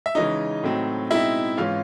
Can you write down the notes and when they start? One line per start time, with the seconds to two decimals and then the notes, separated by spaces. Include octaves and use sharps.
0.06 E5
0.15 C#3 E3 G#3 C#4 D#4 D#5
0.63 A2 F#3 A3 C4
1.11 B2 G#3 C4 D#4 E4 E5
1.57 G#2 E3 G#3 C#4 F4 F5